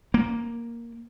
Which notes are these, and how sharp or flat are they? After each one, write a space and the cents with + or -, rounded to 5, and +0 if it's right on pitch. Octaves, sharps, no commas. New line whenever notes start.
A#3 +5